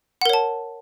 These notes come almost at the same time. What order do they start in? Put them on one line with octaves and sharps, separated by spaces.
F#5 A#4 C#5 A5